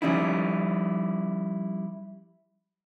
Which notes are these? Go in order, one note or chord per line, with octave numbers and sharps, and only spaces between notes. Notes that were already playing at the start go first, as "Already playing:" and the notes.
F3 G3 G#3 C#4 D#4 E4